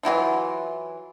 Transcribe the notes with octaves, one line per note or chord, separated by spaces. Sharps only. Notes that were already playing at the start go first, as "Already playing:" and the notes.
E3 F#3 E4 F4